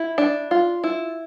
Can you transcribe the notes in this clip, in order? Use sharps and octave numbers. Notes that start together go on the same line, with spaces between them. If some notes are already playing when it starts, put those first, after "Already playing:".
Already playing: E4
D4
F4
E4